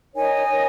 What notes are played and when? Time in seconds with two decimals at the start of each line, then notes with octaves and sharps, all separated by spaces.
0.15 D#4 A#4 C#5 D#5 G#5
0.50 D#4 A#4 C#5